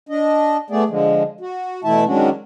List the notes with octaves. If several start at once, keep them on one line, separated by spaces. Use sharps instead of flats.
D4 D#5
A3 B3 G#4 D5
D3 F3 G#3
F#4
B2 E3 A3 E4 E5 A5
D#3 F#3 G#3 C#4 D4 F#4